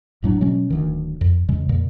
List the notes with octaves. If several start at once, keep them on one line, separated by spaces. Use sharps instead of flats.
F1 A2 F#3 D4
B2 F#3 G#3 C#4
D1 D2 D#3
F2
E2 C#3 G#3
F2 A#2 C#3